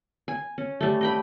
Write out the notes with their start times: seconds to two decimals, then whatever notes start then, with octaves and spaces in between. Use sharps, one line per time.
0.28 G#5
0.58 C#4
0.81 G3 A3
1.01 D#5 G5 B5